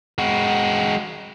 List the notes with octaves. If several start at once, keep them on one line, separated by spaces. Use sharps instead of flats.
G#3 F#4